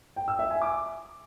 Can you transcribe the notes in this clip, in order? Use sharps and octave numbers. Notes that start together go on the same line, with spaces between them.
G5
E6
E5
G#5
D6